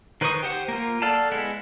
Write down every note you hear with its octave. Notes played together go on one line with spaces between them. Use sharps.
D#3 B4 C5 C#6 D#6
G4 C5 F#5
A#3 F4
A4 D5 F5 F#5 A5
G#3 B3 E4 F#5